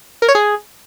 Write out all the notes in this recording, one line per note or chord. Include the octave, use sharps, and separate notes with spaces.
A#4
C#5
G#4